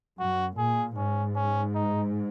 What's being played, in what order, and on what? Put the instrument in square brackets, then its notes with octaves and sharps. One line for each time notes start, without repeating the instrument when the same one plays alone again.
[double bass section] F#2 [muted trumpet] F#4
[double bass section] A#2 [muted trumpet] G#4
[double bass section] G#2 [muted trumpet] C#4
[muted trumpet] C#4
D#4